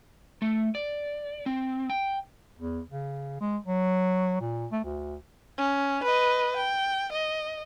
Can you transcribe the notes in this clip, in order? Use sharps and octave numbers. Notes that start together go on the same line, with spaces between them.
A3
D5
C4
G5
E2
C#3
G#3
F#3
A#2
A3
D2
C#4
B4 D#5
G5
D#5